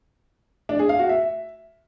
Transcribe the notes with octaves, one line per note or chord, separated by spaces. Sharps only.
D4
G#4
F5
F#4
E5